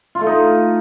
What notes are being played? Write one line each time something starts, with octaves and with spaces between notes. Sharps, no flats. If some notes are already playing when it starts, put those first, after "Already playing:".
F4
A3
D#4